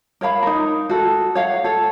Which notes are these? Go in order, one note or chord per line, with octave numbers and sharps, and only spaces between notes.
A#4 C#5 F5 B5
D#4 A#4
F#4 A4
C#5 F5 F#5
A4 C#5